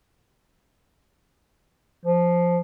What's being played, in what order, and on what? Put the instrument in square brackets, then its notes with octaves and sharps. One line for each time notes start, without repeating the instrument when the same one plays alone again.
[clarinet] F3